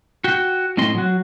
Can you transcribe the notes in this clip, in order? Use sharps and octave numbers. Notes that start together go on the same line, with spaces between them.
F#4 G5
A2 C4 D#5 C6
F#3 F#4